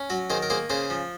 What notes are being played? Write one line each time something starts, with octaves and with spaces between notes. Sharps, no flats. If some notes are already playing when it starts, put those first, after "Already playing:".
Already playing: C#4
F#3 F#4
D#3 G#4 C5
A#4
A#3 G#4 C5
C#3 G#4 C5
F3